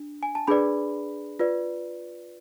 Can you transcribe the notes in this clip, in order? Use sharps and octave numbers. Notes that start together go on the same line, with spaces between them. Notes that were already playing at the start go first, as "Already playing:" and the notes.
Already playing: D4
G#5
A5
D4 G#4 B4 D5 B5
F4 B4 D5